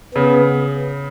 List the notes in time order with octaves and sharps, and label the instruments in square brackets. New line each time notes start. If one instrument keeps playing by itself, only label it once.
[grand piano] C#3 [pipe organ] B3